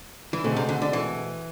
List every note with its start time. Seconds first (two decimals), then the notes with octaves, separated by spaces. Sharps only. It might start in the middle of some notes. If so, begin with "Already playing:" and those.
0.33 E3
0.44 B2 D3 A3 C4 G#4
0.56 C3
0.69 D3
0.82 D3
0.93 E3